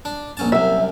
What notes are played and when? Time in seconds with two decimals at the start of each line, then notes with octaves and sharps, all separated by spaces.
0.05 D4
0.37 A#1 C#4 A5
0.52 C2 F#2 E5